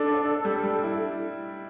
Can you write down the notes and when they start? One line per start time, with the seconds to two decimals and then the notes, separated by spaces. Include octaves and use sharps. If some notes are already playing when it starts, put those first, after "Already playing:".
Already playing: D4 A4
0.14 D4
0.45 G3
0.64 G3
0.84 E4